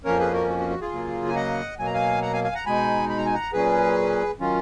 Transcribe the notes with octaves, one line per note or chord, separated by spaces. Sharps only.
F2 F3 A#3 C#4 A#4 C#5
G#4 B4
F#4 A#4
F#4
F#4
F#4
F4 G#4
C#3 F#3 A#3
G#5
D#5 F#5
B2 F#3 A#3 G#5
A#5
F5 G#5
F#5 A#5
F5 G#5
F5 G#5
F#5 A#5
B2 G#3 D#4 G#5 B5
B5
A#5
G#5
F#5 A#5
A#2 F#3 C#4 G#4 B4
D#3 F#3 C#4 F4